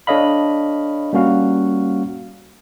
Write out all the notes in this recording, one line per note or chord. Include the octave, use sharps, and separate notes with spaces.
D4 A4 C#5 D#5 F5 B5
G3 A#3 C#4 F#4 F5